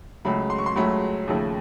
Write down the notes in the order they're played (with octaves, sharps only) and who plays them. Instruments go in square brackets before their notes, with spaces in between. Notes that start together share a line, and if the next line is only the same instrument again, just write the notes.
[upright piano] C#2 C#3 F#3 A3 B5
C6
C#6
C6
C#2 C#3 F#3 A3 B5
D#2 C#3 F3 A3